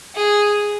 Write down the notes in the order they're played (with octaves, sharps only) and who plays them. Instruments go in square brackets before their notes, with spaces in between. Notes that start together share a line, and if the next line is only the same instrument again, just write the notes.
[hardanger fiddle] G#4